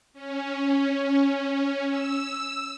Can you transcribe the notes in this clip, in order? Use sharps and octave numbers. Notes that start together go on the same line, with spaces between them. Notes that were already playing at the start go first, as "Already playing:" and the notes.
C#4
E6